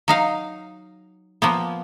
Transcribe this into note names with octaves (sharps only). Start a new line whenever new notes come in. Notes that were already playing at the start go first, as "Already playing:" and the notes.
F#3 D#4 F5
F3 A#3 B3